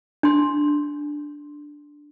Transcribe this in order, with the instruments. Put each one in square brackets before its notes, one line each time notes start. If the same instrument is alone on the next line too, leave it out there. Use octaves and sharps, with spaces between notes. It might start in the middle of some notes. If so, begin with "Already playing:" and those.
[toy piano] D4 C6